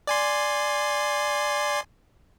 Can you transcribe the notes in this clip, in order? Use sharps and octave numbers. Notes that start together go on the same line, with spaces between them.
D5 G#5 C6